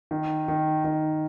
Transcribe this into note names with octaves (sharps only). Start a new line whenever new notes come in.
D#3
D#3
D#3